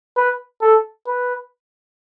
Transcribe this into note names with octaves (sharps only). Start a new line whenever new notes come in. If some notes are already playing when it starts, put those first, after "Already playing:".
B4
A4
B4